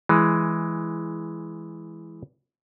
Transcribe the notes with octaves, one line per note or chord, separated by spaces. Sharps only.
E3 G#3